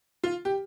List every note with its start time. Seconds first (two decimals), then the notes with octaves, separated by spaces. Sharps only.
0.24 F4
0.45 G4